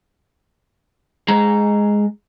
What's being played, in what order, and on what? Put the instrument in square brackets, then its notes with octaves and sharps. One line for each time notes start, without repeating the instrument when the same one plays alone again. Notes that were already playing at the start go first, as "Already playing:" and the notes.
[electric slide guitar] G#3 G#4 A#5